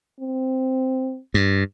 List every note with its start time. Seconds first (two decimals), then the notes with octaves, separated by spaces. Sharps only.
0.20 C4
1.34 G2